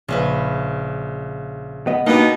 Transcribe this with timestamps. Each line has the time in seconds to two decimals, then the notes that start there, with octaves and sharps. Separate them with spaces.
0.08 A#1 C#3 C#4 B4
1.87 B3 D#5
2.06 B2 A#3 B3 D4 D#4 G4 A5